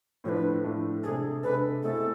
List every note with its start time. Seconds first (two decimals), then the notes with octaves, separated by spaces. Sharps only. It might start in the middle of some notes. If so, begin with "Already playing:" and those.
0.24 A2 F3 A3 D4 B4 C#5
0.64 A2 F3 A3 D4
1.03 C3 G#3 D4 G#4 A4
1.43 C3 G#3 D4 A4 B4
1.83 B2 A3 C4 E4 G#4 A4